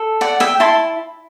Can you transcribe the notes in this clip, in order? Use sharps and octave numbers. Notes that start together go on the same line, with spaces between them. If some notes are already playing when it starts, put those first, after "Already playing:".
Already playing: A4
D5 F#5
E5 G5
E4 A5 C6